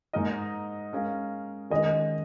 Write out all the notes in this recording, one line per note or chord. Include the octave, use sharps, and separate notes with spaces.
G#2 G#3 D#4 A#4 D#5
G#3 C#4 A#4 F5
D#3 G#3 C#4 D#5